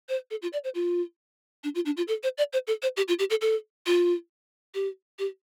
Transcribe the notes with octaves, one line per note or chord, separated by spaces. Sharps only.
C5
A4
F4
D5
C5
F4
D4
F4
D4
F4
A4
C5
D5
C5
A4
C5
G4
F4
G4
A4
A4
F4
G4
G4